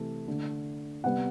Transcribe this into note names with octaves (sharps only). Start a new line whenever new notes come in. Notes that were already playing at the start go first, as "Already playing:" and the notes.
Already playing: C3 E3 A3
D3 A3
C3 G3 B3 F#5